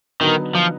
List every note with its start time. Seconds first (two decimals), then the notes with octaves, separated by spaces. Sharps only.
0.21 D3 D#3 F#3 B3 D#4
0.55 F3